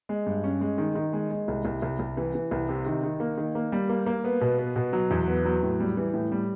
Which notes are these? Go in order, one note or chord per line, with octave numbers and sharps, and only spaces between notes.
G#3
G2
C#4
G#3
D#3
D#3
G#3
G#3
C2
C2
C2
C2
E3
E3
C2
C3
D#3
D#3
A#3
D#3
A#3
G3
A#3
A#3
B3
B2
B3
B2
F#3
E2
B3
F#3
A2
G3
E3
A2
G3